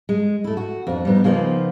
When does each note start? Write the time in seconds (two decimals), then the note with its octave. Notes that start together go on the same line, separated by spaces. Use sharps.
0.09 G#3
0.44 A3 E4
0.57 F#4
0.87 F2 D4
1.05 G3 B3 D#4
1.24 C#3 F3 A#3 B3 D#4 F4